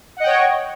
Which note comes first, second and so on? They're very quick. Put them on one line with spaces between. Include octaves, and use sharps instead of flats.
F#5 D#5 G5 C#5